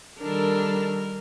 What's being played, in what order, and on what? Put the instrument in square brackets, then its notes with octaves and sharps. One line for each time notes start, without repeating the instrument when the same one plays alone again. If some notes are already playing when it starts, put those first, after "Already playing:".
[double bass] D#3 G3 [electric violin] D4 A4 [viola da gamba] A#4